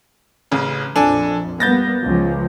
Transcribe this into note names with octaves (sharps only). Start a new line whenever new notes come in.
A1 C#3
A#1 F2 D4 A4 G#5
G3 A#3 B3 G6 A6 A#6
C#2 F3